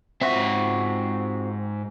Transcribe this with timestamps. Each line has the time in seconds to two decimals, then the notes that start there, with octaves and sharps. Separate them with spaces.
0.21 G#2 C4 F4 F#4 E5